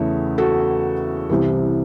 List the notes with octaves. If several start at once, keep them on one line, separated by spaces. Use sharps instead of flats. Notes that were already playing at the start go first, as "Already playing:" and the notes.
Already playing: E2 C#3 E3 A3 C#5 E5
F#4 A4
C2 C3 E3